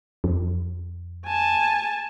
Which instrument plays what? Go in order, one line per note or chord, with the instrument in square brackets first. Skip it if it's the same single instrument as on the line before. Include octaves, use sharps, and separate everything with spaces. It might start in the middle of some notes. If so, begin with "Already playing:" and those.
[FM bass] F2
[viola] G#5 A5